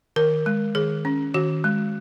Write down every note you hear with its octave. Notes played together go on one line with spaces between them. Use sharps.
D#3 A#4
G#3
D#3 G#4
C#4
D#3 F#4
G#3